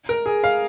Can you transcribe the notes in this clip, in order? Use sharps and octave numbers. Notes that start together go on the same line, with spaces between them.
A#4
G#4
F5